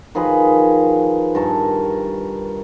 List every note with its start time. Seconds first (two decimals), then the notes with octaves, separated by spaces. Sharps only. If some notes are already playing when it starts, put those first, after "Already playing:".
0.15 D#3 F3 G#4 B4
1.35 G2 A#4 A5 C#6